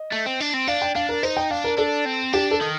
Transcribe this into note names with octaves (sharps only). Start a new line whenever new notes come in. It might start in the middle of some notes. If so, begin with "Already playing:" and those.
Already playing: D#5
A3
C4
D4
C4
D4 F5
G5
D4 F5
A#4
D#4 C5
G5
D4 F5
A#4
D4 A4
C4
D4 G4
A4
D#3